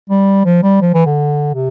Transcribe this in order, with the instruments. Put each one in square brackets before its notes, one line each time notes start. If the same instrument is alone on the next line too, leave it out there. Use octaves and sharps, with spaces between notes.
[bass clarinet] G3
F3
G3
F3
E3
D3
C3